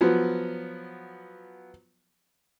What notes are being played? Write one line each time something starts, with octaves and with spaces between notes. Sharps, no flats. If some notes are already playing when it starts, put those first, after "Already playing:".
F3 F#3 B3